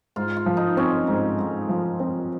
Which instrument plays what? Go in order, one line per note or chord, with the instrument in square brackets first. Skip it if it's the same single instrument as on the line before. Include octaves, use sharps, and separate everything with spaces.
[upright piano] G#2 [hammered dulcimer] F4
[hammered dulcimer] F4
[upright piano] F3
[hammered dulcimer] D#4
[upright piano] C4 [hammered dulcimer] C#4
[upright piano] G#2
G#2
F3
C4